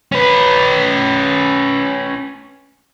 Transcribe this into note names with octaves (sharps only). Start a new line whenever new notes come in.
C#4 B4